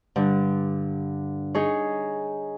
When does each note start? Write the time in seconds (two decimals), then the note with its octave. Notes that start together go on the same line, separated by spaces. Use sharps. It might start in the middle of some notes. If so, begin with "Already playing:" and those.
0.16 G2 D3
1.55 D#4 G#4 C#5